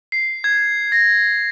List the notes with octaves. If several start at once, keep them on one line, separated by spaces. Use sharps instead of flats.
C7
G#6
A#6